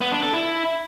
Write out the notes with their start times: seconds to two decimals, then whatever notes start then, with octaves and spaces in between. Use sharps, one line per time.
0.01 B3
0.12 D4
0.22 A4
0.33 E4